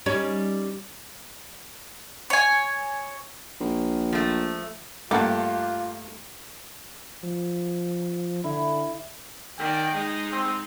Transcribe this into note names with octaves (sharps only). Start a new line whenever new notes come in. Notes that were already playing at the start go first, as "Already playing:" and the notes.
G3 C#4 D#4
C#5 G#5
A#1
F3 A3
G2 A3 A#3 F4 G4 F#5
F3
D3 E4
D#3 D5 G5
G#3 D#4
C4